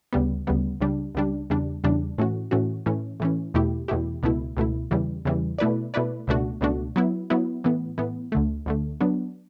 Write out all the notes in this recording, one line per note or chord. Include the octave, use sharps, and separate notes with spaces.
D2 C#3 G3 B3
D2 C#3 G3 B3
C#2 C#3 G3 D4
C#2 C#3 G3 D4
E2 C#3 G3 D4
E2 C#3 G3 D4
A2 E3 A3 C#4 F#4
A2 E3 A3 C#4 F#4
A2 E3 A3 C#4
A2 E3 A3 C#4
E2 B2 A3 E4 G4
E2 B2 A3 E4 G4
C#2 B2 A3 E4
C#2 B2 A3 E4
E2 C#3 E3 G3
E2 C#3 E3 G3
B2 A3 E4 B4 D5
B2 A3 E4 B4 D5
C#2 B2 A3 D4 F#4
C#2 B2 A3 D4 F#4
F#3 B3 E4
F#3 B3 E4
A2 E3 B3
A2 E3 B3
D2 D3 A3
D2 D3 A3
F#3 B3 D4